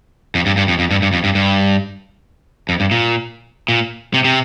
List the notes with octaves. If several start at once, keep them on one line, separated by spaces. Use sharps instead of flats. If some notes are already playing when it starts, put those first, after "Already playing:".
F2
G2
G2
F2
F2
G2
G2
F2
G2
G2
F2
G2
A#2
A#2
C3
C3